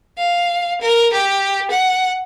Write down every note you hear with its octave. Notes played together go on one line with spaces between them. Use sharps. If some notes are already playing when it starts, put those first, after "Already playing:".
F5
A#4
G4
F#5